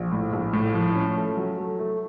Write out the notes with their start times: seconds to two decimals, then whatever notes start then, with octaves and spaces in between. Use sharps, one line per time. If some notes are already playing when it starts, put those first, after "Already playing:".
Already playing: A#1
0.12 A2
0.33 A#1
0.53 A2
0.74 F3
0.95 C#4
1.16 A3
1.37 F#3
1.58 A3
1.79 A3